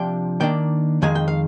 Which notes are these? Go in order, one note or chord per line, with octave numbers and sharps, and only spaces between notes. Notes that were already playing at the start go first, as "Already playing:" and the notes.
Already playing: C3 F3 D4 G5
D#3 A#3 D4 G5
F2 D#3 G#3 G#5
G5
F5